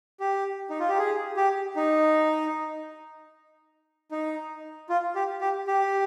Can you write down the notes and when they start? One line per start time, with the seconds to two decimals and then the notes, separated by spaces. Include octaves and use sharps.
0.20 G4
0.70 D#4
0.80 F4
0.89 G4
0.98 G#4
1.37 G4
1.76 D#4
4.11 D#4
4.90 F4
5.15 G4
5.41 G4
5.67 G4